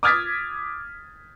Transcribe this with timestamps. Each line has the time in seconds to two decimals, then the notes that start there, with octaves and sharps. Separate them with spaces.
0.03 D6 D#6 F6 G#6 A6 B6